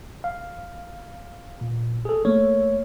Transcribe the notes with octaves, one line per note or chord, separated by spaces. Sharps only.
F5
A#2
G#4 A4
A3 A#3 C#5